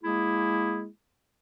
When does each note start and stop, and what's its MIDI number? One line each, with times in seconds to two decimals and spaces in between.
0.04 0.86 56
0.04 0.86 58
0.04 0.86 64
0.04 0.86 68